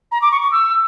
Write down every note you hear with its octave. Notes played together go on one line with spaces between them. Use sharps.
A#5
D6
C#6
C#6
E6